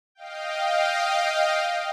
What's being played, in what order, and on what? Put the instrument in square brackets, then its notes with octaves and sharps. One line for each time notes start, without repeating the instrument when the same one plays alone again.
[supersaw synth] D#5 F5 G5